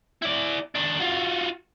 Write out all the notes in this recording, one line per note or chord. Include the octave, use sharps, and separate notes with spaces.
E4 D5
D#3 D4
F4 F#4